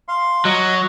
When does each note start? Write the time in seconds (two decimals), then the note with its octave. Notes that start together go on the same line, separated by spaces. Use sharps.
0.08 F5 C6
0.45 F#3 D#5